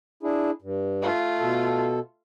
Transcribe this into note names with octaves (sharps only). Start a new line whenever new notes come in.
D4 E4 G#4
G2
A3 F4
B2 A4